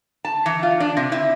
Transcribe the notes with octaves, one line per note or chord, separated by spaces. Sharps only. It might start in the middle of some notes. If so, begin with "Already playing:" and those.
A5
E3
F4
D4
C3
E4